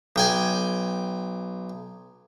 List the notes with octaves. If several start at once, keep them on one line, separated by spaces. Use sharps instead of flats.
B1 G5 G#5